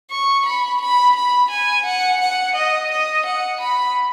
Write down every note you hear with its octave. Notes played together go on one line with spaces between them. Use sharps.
C#6
B5
B5
B5
G#5
F#5
F#5
D#5
D#5
F#5
B5